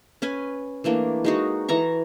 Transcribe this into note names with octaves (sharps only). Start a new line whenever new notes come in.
C#4 B4 G#5
E3 A3 A#3 D4
G#3 D#4 F#4
E3 A4 A#5 C#6